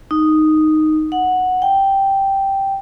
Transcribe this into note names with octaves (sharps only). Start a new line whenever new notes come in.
D#4
F#5
G5